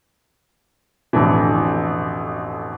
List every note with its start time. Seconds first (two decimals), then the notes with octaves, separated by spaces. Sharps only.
1.13 A1 F2 B2 D3 E3